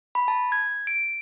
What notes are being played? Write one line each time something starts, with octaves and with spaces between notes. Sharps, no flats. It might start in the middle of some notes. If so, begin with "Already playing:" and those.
B5
A5
G#6
D7